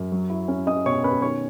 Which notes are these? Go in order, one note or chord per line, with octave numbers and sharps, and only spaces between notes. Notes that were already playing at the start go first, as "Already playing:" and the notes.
Already playing: F#2
F#3
E4
C#4
C#4 D#5 D#6
B2 C#5 C#6
C#4 B4 B5
D#3 C#5 C#6